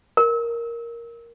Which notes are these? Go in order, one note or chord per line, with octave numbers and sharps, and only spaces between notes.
A#4